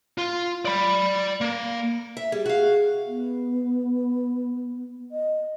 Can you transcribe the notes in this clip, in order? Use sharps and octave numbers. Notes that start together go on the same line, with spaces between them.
F4
D5 B5
A#3
E5
G3 G#4
F#4 F5
B3
D#5